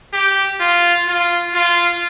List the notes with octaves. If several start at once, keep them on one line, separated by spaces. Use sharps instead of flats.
G4
F4
F4
F4